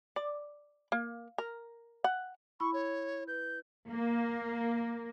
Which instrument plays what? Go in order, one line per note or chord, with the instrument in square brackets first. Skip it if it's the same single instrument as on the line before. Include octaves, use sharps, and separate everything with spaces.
[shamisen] D5
A#3
A#4
F#5
[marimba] E4 B5 [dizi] C#6
[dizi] C#5
[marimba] B4 [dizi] G6
[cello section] A#3